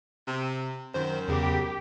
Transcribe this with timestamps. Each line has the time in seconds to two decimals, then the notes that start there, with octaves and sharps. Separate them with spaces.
0.27 C3
0.94 F#2 D#3 C5
1.28 E2 C#3 G4